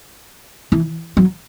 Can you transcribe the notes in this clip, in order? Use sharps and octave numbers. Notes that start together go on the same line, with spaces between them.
E3
F#3